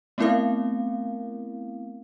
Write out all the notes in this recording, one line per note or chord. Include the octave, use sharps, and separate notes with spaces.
A3 B3 C4 E4 A#4 F5